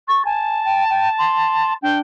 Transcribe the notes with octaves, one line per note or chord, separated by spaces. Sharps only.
C#6 A6
G#5 A5
G5
G5
C6
D4 G5